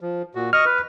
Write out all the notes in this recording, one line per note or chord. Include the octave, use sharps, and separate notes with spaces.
F3
A#2 F#4
D#5 C#6 F6
B4